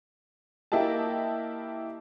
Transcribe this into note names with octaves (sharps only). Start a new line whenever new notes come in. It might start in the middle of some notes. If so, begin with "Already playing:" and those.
A#3 E4 G4 D#5 A5